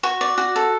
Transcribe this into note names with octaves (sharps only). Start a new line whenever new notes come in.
F#4 C#6
D5
F#4
A4